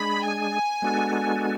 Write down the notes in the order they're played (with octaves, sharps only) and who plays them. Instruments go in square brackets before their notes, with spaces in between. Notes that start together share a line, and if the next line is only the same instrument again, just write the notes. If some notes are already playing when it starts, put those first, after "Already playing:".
Already playing: [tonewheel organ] G#3 D4 G#4 [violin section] B5
[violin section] G#5
[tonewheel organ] G#3 B3 D4 F#4 A4